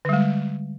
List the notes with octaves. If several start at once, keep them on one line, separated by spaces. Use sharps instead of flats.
D3 G3 G#3